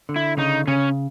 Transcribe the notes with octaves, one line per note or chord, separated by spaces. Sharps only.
D3
E4
C#3 D#4
C#3 C#4